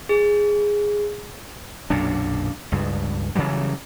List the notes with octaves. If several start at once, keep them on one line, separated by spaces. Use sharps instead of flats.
G#4
B1 F#2 A#2 D4
C#2 G2
C#3 E3 F#3 G3